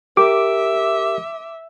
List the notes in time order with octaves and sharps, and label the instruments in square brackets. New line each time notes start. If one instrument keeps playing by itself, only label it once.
[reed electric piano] G4 A#4 [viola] E5 [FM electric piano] D6